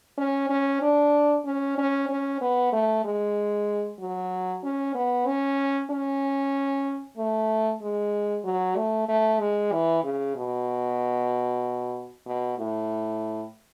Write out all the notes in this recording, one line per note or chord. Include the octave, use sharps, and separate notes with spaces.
C#4
C#4
D4
C#4
C#4
C#4
B3
A3
G#3
F#3
C#4
B3
C#4
C#4
A3
G#3
F#3
A3
A3
G#3
E3
C#3
B2
B2
A2